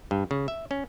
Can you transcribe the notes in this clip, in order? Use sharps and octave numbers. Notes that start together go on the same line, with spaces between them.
G2
C#3
E5
C#4